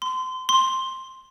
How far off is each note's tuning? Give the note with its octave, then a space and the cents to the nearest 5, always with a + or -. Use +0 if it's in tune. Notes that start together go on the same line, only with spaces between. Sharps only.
C6 -30
C6 +5